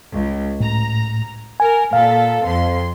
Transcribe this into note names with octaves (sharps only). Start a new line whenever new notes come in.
C#2
A2 A#5
A#4 G#5
A#2 A4 F5
F2 C6